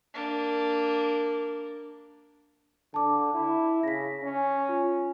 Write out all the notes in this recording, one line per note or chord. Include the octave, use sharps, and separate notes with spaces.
A#3 D4
D3 A5 D6
E4
C#3 A#6 B6
C#4
F4